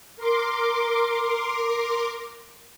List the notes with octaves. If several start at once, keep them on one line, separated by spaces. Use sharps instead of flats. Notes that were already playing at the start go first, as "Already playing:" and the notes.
A#4 C6 D6